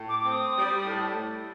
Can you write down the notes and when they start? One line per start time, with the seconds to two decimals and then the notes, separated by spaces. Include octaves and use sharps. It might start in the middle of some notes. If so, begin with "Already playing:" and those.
Already playing: A2
0.09 D6
0.21 C4 D6
0.32 D#6
0.55 G3
0.85 A2